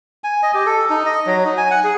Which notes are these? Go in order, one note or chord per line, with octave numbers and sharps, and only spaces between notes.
G#5
D#5
G4
A4
D#4
D#5
F#3
D#4
G#5
F#5
G#4